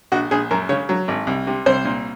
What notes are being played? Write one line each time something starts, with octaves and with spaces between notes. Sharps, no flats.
A#1 F#4
A#1 G#4
F#2 A#4
C#3 C#5
F#3
G#1
C2
C3
C2 C5
A#2